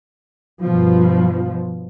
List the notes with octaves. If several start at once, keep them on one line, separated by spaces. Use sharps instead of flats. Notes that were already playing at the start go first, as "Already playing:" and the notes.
G2 B2 F3